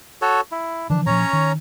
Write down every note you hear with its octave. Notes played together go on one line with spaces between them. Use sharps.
F#4 A4 C#5
E4
D3 E3 F3 D4
A#2 F3 C#4 C#5 A#5
D#3